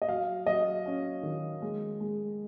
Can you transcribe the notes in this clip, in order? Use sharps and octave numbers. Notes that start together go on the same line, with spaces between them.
D#5
F#3 F5
F#3 D#5
C#4
D#3
G#3
G#3